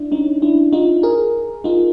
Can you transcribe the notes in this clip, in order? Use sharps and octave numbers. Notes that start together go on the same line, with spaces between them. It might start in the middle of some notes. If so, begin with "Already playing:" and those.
Already playing: D4 E4
C#4 D#4
D4 E4
D#4 F4
G#4 A#4
D#4 F4